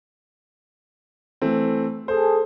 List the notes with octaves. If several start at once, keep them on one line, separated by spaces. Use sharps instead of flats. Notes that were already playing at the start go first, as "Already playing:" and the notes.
E3 A3 C4
G#4 A4 C5